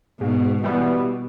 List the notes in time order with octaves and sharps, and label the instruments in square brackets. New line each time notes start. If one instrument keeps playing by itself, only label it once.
[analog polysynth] G#2 [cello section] B2
[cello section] B2 [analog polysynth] E3 G3 B3